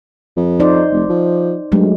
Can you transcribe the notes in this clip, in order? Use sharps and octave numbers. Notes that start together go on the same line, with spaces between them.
F2
D#4 C5 D5
F1
F3
G2 F#3 G#3 A3